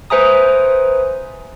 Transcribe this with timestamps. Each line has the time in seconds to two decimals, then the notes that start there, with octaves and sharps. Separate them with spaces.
0.10 B4 C5 E5 G#5 A#5 D#6